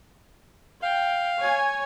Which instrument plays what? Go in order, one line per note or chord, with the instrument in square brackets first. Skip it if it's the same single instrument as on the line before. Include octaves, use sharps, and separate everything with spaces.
[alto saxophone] F5 [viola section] G5
[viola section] C#5 G#5